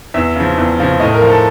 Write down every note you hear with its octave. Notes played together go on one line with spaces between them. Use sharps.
E2 E5
C#3 F3
E2
C#3 F3
A2 D#5
A#4
F3
A4